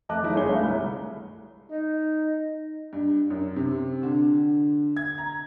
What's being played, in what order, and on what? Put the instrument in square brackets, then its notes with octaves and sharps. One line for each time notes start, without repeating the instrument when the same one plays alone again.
[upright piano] F2 A3 D#5 A5 D6 F#6
F#1 A3 D#4 E4
G1 G#4 C#5 G7
A3 F5
C2 B5
[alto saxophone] D#4
[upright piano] G2
F#2
C3
D3
G#6
A#5